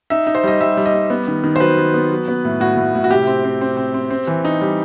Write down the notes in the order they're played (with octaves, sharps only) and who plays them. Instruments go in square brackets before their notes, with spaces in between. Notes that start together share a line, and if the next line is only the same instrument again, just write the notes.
[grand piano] D#4 E5
D#4
C5
G3 D#5
G3 E5
G3
D#5
G3
B3
D#3
D#3
C5
F#3 B4
D#3
B3
F#3
B3
A2
A2 F#4
A2
A2
F#4
C3 G4
C4
C4
C4
C4
C4
C4
E3
D#4
G3